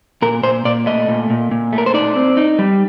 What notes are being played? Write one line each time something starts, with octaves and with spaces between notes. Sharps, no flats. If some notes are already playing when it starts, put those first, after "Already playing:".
A#2 A#4
A#2 C5
A#2 D5
A3 D#5
A#2
A#2
A#2
A3
A#4
C5
D#4 D5
C4
D#4
G3